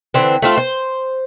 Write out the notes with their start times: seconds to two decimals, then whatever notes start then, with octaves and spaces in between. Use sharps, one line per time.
0.14 D3 E3 C4
0.42 A3 C4 F4
0.58 C5